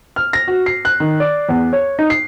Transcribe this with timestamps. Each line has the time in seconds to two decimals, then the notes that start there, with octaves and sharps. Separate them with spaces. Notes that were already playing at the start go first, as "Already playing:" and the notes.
0.16 F6
0.33 A#6
0.48 F#4
0.66 C7
0.85 F#6
1.00 D#3
1.20 D5
1.49 E2
1.73 C#5
1.99 D#4
2.10 C7